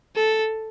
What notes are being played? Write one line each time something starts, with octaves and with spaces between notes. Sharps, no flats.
A4